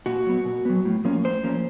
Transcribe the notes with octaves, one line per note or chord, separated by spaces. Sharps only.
A#2 F#4
F#3 B3
A#2
F#3 B3
A2
F3 A#3 C#4
A2 C5
F3 A#3 C#4